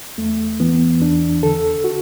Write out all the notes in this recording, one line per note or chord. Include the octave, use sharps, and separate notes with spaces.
E2 A3
E3 B3
E2 D4
D3 A4
F#4